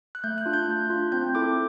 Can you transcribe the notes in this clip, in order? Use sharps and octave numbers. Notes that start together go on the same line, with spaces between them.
F#6
A3 G6
F#6
D4 F4
G6
A3
D4 F4
C4 G6
E4 A4 D6